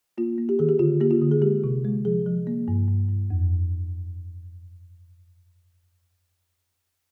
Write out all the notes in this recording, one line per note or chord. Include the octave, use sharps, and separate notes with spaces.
A#3 F4
A#3
G4
D#3 G#4
G4
D3 F4
A#3 G4
F4
D3
G#4
G#3 G4
C3
G#3
F3 G#4
F3
A#3
G2
G2
G2
F2